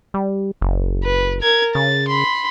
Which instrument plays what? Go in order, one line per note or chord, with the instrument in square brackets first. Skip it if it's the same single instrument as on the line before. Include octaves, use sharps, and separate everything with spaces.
[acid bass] G3
F#1
[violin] B4
A#4 G#6
[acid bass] C#3 [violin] A6
[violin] B5 C6